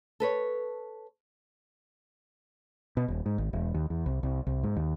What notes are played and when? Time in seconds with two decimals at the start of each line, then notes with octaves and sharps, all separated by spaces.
0.20 A4 B4 C#5
2.97 B2
3.08 D#1
3.26 G#2
3.38 G#1
3.53 E1
3.74 D#2
3.90 E2
4.06 C2
4.23 C2
4.47 C2
4.63 G#2
4.76 D#2